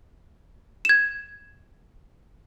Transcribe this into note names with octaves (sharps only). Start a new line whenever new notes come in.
G#6 E7